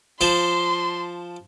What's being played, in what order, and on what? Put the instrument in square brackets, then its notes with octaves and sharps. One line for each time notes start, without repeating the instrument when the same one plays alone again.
[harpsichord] F3 C5 A5 [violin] C6